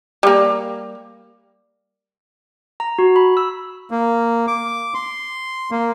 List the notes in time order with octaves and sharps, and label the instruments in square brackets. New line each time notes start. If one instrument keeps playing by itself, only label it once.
[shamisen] G3 A#3
[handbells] A#5
F#4
B5
E6
[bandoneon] A#3
D6
C6
A#3